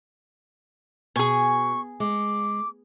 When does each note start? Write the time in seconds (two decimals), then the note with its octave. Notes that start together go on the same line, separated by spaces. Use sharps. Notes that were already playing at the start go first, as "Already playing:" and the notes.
1.16 B2 G#4 G#5 C#6
2.00 G#3 D6